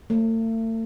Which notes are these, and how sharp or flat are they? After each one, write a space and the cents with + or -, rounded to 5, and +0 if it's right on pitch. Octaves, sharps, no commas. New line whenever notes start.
A3 +40